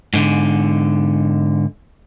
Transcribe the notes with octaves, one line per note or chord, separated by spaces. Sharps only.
G#2 D3